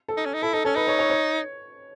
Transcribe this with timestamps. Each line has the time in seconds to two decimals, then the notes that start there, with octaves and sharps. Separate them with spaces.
0.08 A4
0.17 D#4
0.26 C#4
0.34 D#4
0.42 E4 A4
0.53 D#4 A4
0.65 C#4 A4
0.76 D#4 B4
0.87 C#5
0.99 C#5
1.10 C#5